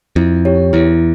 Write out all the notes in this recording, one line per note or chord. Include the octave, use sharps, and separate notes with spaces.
F2 E4
G4 C#5
E2 E4